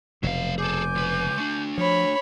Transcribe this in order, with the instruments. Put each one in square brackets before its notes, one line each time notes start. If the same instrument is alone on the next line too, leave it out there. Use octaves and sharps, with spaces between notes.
[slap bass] F1 B2 [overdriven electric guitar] F#3 F5
[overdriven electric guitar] G#4 A4 [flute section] G#5 D6 G6
[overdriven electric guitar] C#2 B4
A3 D4
[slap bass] F3 [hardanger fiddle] C#5 B5